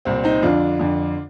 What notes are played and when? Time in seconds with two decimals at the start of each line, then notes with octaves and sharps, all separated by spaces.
0.05 C2 A#2 C4
0.24 C4 D#4
0.42 F2 D3 D4 F4
0.79 F2 D3